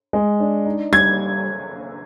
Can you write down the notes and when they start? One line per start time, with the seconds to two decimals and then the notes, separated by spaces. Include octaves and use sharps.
0.13 G#3
0.40 D4
0.66 D#4
0.92 G3 G#6